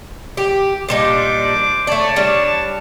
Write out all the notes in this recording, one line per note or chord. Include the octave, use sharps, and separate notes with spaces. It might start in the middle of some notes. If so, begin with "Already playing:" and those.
G4
A#2 G3 D4 D#4 C5 D6
A3 C#5 D5 A5
G3 D4